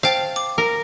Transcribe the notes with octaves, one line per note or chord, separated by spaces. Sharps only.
C5 F5 G5 A5
D6
A#4